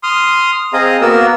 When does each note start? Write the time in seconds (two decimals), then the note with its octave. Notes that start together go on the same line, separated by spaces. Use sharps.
0.03 C6 D#6 F6
0.73 C4 G#4 D#5 F5 A#5
1.01 A#3 B3 F#4 A#4 E6